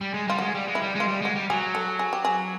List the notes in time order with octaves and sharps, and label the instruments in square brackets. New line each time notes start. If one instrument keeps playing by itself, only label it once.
[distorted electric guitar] G3
G#3
[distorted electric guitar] G3 [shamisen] F4
[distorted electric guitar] G#3 [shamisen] F#4
[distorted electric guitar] G3
G#3
[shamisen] E4
[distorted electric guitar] G3
[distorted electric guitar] G#3 [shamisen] F4
[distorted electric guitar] G3
[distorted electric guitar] G#3 [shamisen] F#4
[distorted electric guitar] G3
[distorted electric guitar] F#3 [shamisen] G#4
[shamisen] A4
G#4
G4
G#4